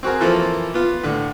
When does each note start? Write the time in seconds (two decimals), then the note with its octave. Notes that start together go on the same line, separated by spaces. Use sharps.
0.03 C4 F#4 G#4 A#4
0.21 E3 F3 A#3 C4 F4 A4
0.74 B3 F4
1.03 A2 D3